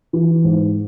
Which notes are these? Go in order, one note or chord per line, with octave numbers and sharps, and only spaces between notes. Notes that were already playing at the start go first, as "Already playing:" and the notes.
E3
G#2